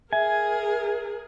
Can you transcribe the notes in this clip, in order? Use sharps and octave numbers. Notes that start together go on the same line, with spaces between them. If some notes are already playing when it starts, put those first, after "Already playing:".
G#4 A#4 E5 G#5